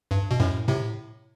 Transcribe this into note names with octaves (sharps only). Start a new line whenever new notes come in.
G2
B2
F#2 A2
A2 C3